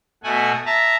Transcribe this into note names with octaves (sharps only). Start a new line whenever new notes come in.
B2 A3 F#5 G#5
E5 A5 A#5